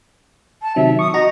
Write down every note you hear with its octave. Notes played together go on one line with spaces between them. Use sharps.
A5
C3 D#3 F#3 E5
C#6 D#6
F#4 D#5 A#5